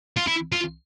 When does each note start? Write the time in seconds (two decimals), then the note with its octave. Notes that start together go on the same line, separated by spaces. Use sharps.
0.17 F4
0.27 E4
0.52 F4